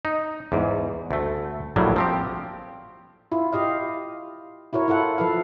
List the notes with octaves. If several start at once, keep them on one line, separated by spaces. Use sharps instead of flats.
D#4
E2 G#2
D2 A3
A#1 A2 F#3 G3
F3 C4 G4
E4 F4
F4 G4 D#5 F5
E4 F#4 A#4 C#5
E4 F4 A4 F#5
F3 A4 B4 F5